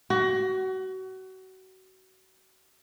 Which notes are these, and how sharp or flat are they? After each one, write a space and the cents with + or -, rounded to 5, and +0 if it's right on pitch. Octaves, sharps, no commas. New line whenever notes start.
F#4 +30